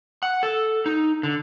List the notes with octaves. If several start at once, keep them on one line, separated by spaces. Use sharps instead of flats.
F#5
A4
D#4
D3